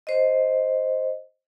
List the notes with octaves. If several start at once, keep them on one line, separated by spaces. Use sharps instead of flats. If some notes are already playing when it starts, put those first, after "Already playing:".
C5 D#5